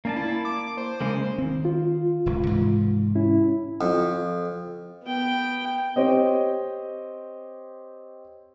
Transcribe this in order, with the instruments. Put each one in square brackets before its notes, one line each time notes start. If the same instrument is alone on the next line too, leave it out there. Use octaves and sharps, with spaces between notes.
[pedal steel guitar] A#3 D5 A5 [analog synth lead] C#4
[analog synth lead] E4
D6
C5
[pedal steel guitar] C#3 G#3 A#3
[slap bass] D#3 C4
[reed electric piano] F4
[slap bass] D1 C#2
G#2 C3 E3
[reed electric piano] C#4 E4
[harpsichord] F2
[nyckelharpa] B3 G5
[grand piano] C4 G4 C5 C#5 D#5